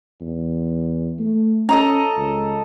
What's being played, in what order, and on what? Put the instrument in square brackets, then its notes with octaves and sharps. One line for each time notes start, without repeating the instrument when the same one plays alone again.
[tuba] E2
A3
[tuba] C#4 [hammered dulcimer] A4 D#5 A#5
[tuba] C#2